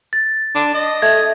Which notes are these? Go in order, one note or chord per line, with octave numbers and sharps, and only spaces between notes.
A6
D4
D#5
A3 G#6